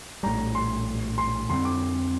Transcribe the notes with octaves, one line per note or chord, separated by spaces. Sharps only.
A#1 A2 G3 A#5
C6
C6
F2 D3 G3 C4 C6
D6